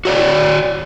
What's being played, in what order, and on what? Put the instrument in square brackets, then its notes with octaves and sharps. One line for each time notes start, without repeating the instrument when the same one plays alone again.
[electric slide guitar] F#4 C#5 D5